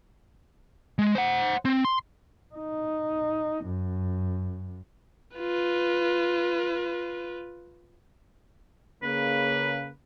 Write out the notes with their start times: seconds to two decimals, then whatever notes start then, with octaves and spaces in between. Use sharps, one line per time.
0.99 G#3
1.15 C5 F#5
1.65 C4
1.85 C6
2.55 D#4
3.64 F#2
5.37 F4 B4
9.03 C#3 A#3 B4